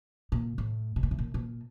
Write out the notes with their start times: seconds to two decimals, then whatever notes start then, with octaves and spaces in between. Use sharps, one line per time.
0.32 A#2
0.58 A2
0.96 B2
1.03 A#2
1.11 A2
1.19 A#2
1.34 A#2